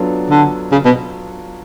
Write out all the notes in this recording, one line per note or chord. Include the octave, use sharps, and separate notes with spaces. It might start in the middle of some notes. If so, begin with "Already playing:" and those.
Already playing: F#3 B3 D4 F4 A4
D3
C#3
B2